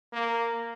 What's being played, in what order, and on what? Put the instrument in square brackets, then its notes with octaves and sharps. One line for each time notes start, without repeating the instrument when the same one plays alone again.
[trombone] A#3